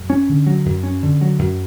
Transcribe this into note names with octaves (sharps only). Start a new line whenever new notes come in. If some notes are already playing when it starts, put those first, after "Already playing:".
Already playing: F#2
C#4
D3
F#3
F#2
C#4
D3
F#3
F#2